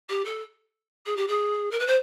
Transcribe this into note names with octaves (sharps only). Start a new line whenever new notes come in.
G4
A4
G#4
G4
G#4
A#4
B4
C5